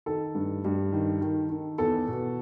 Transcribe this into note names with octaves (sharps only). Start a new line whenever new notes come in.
D#3 A4
G2
G2
D#3
D#3
D#3
E2 A4
B2